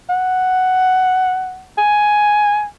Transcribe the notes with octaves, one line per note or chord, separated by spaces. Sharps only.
F#5
G#5